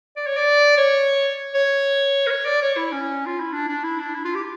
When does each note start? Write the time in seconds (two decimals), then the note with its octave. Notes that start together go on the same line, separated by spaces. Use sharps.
0.16 D5
0.26 C#5
0.37 D5
0.77 C#5
1.54 C#5
2.26 A#4
2.30 C#5
2.45 D5
2.62 C#5
2.77 E4
2.92 C#4
3.26 F4
3.39 E4
3.53 D4
3.68 D4
3.84 E4
3.99 D4
4.14 E4
4.25 F4
4.35 G4